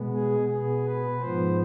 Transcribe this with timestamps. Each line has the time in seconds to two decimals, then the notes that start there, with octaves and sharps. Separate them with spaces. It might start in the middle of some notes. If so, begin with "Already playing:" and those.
Already playing: B2 G#3 B3
0.14 G#4
0.49 B2 B3 G#4
0.85 B4
1.19 G#2 F3 B3 C5